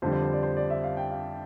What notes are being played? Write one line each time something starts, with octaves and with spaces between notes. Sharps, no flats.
F2 D3 G3 C5
C5
C5
D5
C5
D5
E5
F5
G5
F5